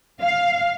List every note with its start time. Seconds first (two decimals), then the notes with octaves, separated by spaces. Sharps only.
0.22 F5